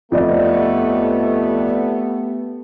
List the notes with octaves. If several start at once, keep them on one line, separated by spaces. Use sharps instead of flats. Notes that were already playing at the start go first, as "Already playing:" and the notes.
F2 A3 B3 G4 D5 D#5